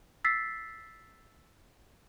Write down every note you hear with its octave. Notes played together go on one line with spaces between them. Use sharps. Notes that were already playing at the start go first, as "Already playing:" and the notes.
E6 A6 B6 C7